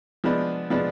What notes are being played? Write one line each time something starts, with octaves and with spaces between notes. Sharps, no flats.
F3 G#3 B3 D4
F3 G#3 B3 D4